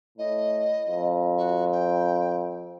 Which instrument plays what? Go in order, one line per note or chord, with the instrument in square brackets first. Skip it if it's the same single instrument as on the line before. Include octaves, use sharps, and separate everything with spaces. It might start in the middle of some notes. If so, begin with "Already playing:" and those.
[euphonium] A2 [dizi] D#5
[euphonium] F2
[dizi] F#4
G5